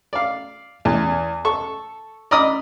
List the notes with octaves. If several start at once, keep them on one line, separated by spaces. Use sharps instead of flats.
D5 F5
E2
A4 C#6
D5 D#5 A#5 B5 D#6